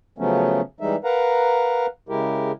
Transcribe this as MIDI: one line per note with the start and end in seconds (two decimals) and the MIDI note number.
0.18 0.61 49
0.18 0.61 53
0.18 0.61 54
0.18 0.61 57
0.18 0.61 59
0.18 0.61 61
0.80 0.96 52
0.80 0.96 55
0.80 0.96 56
0.80 0.96 63
0.80 0.96 76
1.04 1.86 70
1.04 1.86 71
1.04 1.86 77
1.04 1.86 78
1.04 1.86 82
2.09 2.52 49
2.09 2.52 56
2.09 2.52 64
2.09 2.52 67
2.09 2.52 70